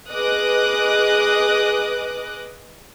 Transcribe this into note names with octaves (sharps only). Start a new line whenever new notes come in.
G#4 B4 D#5 D6 D#6 F#6